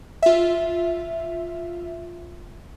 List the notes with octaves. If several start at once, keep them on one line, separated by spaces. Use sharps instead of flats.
F4 E5